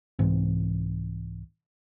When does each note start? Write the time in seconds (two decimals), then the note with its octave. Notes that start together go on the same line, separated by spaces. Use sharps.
0.19 C2 G#2 E3 C4